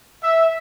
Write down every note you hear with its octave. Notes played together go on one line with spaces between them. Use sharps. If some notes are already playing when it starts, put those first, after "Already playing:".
E5